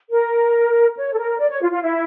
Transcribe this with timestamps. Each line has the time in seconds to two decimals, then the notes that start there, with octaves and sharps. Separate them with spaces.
0.10 A#4
0.97 C#5
1.13 A4
1.17 A#4
1.39 D5
1.50 C#5
1.61 F4
1.72 F4
1.82 E4